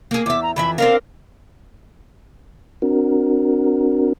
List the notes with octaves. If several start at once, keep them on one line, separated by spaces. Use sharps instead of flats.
A#3 G#4
E2 E5 D6
A#5
F2 E3 E5 B5
C4 D4 A#4 F5
C4 D4 F#4 A#4